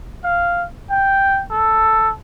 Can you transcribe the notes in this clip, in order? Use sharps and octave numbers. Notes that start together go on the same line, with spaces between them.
F5
G5
A4